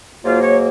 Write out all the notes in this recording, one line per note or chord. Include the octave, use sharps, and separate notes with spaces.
G#2 F#3 A#3 F4
C#5